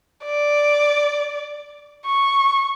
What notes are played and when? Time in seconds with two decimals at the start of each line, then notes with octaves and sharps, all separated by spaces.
0.25 D5
2.06 C#6